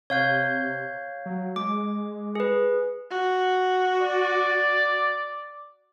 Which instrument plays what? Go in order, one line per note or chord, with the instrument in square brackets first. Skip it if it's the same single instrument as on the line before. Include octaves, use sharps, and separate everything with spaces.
[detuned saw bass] C3 [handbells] C#5 F5 G6
[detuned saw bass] F#3
[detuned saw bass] G#3 [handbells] D6
[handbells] G#4 B4
[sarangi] F#4
[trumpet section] D5